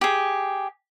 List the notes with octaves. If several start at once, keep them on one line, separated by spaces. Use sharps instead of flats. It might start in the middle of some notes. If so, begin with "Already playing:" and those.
G4 G#4